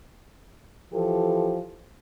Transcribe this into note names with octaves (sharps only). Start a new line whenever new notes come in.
E3 F3 G4 A4